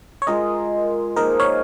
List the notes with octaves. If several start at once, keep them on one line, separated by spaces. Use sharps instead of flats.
C#5
G#3 F4 G#4 A#4 D#5
F3 A#3 D#4 G#4 A#4 D#5
C#5 F5